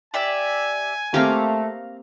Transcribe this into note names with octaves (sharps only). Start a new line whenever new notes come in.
G4 D5 E5 G#5
A3 A#3 C4 G4 F5 A#5